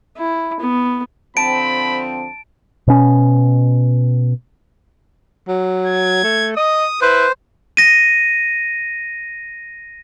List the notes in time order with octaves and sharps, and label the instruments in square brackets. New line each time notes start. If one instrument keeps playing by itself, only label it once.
[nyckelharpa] E4
B3
[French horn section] D3 F3 C4 [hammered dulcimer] A5 [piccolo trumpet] B5 [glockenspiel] D7
[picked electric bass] B2 C#4
[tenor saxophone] F#3
[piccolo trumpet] G#6
[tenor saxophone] A3
[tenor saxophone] D#5 [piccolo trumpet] D#6
[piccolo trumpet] E4 [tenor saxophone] B4 [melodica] C5
[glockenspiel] A#6 D#7